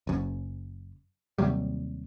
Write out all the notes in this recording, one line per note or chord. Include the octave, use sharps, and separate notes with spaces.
F#1 F#2
D#2 C3 F#3 G3